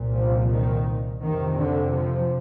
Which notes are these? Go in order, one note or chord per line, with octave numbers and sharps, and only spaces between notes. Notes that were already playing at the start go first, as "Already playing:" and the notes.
Already playing: C2 A#2
F3
D#3
F2 C3 D#3
D3
F3